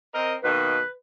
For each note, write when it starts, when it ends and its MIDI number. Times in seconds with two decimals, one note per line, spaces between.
0.14 0.36 60
0.14 0.36 70
0.14 0.36 75
0.44 0.79 47
0.44 0.79 51
0.44 0.79 58
0.44 0.90 71